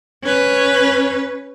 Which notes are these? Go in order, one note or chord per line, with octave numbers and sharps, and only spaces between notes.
C#4 B4